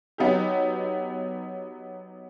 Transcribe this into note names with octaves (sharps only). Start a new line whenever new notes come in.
F#3 B3 D#4 G4